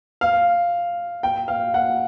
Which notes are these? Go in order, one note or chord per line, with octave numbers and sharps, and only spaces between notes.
F5
G5
F5
F#5